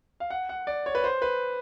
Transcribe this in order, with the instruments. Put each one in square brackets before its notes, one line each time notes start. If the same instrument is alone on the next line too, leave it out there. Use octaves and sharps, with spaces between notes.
[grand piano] F5
F#5
F#5
D5
C#5
B4
C5
B4